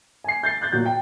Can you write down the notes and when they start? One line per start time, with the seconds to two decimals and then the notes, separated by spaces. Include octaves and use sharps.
0.24 G#5 C7
0.43 G6 A6 C7
0.61 F#6 G6 A6
0.72 A#2 F#3 G6
0.86 G5